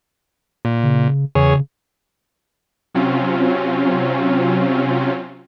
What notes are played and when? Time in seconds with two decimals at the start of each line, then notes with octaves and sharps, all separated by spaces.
0.65 A#2
0.83 C#3
1.35 E2 C#3 G#4 C#5
2.94 C3 F#3 C4 C#4 F4